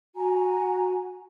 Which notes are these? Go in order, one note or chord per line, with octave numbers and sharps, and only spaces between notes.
F#4 G#5 A#5